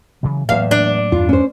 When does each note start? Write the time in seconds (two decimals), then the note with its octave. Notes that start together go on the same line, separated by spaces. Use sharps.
0.23 C#3 E3 F#3
0.49 E2 A2 F#3 A#3 E5 F5
0.71 D4
1.12 E2 G2 F4
1.29 C#4 C5